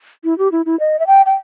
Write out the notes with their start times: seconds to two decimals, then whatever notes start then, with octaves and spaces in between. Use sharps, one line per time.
0.24 E4
0.38 G4
0.52 E4
0.66 E4
0.80 D#5
0.99 E5
1.07 G5
1.26 G5